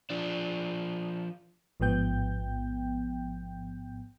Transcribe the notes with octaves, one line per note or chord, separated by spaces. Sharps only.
F3 D4
A1 G#2 F3 B3 G5 G6